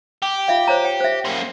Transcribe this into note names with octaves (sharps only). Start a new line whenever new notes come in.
G4
F4 E5 F5
C5 C#5 A#5
G5
C5 E5
A#3 C#4 C6